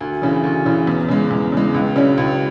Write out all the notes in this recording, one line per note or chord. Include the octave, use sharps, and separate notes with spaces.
D2
C#3 E3
D2
C#3 E3
E2
C#3 G#3
E2
C#3 G#3
C#2
C#3 F#3 C#4
C#2